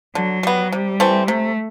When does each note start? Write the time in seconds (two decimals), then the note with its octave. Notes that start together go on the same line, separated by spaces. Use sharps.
0.15 D3 F#3
0.43 G3 B3
0.72 C3 G3
1.00 E3 A3 C4
1.28 C3 A3